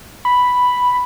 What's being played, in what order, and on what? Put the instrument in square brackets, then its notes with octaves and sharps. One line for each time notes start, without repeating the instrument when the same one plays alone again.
[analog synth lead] B5